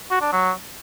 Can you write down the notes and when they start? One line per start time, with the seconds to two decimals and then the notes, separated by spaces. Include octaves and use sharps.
0.11 F#4
0.22 D4
0.32 F#3